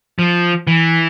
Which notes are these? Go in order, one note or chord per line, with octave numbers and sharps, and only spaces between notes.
F3
E3